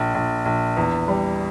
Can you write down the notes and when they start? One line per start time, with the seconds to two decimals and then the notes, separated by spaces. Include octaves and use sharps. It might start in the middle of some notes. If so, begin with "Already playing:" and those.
Already playing: A#1
0.14 A#1
0.45 A#1
0.77 E2
1.08 G3